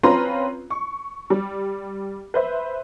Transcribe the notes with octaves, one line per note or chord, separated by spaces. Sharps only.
C4 C#4 F4 B4 A#5 C6
C#6
G3
B4 C5 E5